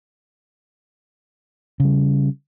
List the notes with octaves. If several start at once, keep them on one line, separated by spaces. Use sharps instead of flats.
C#3 G3